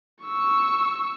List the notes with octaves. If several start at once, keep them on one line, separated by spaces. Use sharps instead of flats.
C#6 E6